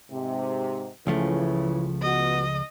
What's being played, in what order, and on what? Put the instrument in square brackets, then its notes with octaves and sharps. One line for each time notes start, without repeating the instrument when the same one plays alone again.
[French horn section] G#2 C3
[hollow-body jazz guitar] C#2 F3 A3 [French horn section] C#3 E3
[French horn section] B3 F#4 [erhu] D#5